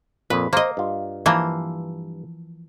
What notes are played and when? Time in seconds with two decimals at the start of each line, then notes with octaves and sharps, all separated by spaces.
0.30 F2 A#2 B4
0.53 A#3 C5 D#5
0.77 G2 F4
1.26 E3 F3 A#3